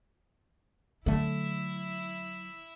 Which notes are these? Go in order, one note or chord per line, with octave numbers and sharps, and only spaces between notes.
D3 F#3 A3 E4 E5